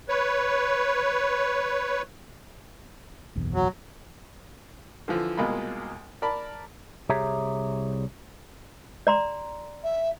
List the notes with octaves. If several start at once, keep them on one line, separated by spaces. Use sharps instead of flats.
B4 C#5
F#1 B1 E2
F#3
D3 E3 F3
C2 B2 G#3 A#3 F4 B5
A#4 D5 A5 B5
C2 G4 G#4 C#5 E5 A#5
D5 A#5 C6
E5